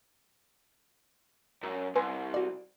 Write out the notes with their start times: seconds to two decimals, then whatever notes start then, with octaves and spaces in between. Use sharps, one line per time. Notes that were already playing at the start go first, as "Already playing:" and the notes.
1.63 F#2
1.96 C2 B4 G#5 C6
2.34 F#4 D5